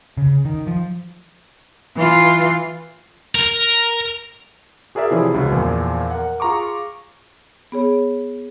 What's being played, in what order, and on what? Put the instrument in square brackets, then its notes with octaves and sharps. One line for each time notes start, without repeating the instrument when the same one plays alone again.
[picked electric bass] C#3
D#3
F3
[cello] E3 F4
[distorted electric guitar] A#4
[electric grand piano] F#4 G#4 A#4 D5 E5
C3 E3 F3 C#4 E4 G#4
C#2 C#3 F#4
E2 A#2 F3
A#4 F#5
F4 G#4 A#5 C#6 D6
[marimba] B3 G#4 C#5